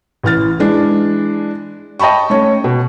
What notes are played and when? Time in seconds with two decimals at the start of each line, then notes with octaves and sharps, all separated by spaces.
0.23 A1 E3 F6 A6
0.59 E3 G#3 D4
1.99 D#5 G5 A5 B5 C#6
2.30 A3 C#4 C#5
2.64 B2